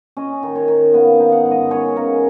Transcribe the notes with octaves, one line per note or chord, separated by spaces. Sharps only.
C#4 D#5
D#3
C#5
D#3
B3 F5
F5
D#4
F#5
G#2
D#5
C#4 C#5
C#3 A#4